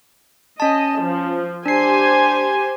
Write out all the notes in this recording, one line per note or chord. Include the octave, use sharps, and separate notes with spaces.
C#4 D#5 A5
F3
D4 G4 C5 G#5 C7